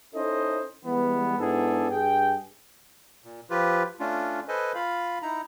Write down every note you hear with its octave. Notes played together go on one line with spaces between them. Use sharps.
C#4 D#4 E4 A4 C5 D#5
E3 G3 G#3 B3
G#2 B3 D4 E4 G#4 A4
G2 G#4 G5
A#2
F3 F4 G4 B4
A3 C#4 D4 F4
A4 B4 C5 D#5 G#5
F4 F5 B5
D#4 E4 A#5